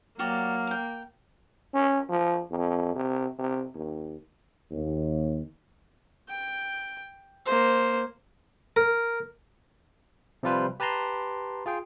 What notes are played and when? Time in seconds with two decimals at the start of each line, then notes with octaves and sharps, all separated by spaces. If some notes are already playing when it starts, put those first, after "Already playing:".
0.19 F#3 A#3 F#4 G4 D5 F6
0.67 A#4 G5
1.74 C#4
2.09 F3
2.51 F2
2.96 C3
3.38 C3
3.75 D#2
4.71 D#2
6.29 G5
7.46 A#3 C5
8.76 A#4
10.43 C3 F3 G3 F4 B4 C5
10.80 G4 B4 A5 A#5 C6
11.66 F4 G#4 G5